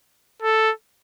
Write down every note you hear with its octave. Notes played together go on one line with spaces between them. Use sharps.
A4